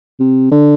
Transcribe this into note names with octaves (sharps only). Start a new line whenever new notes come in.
C3
D3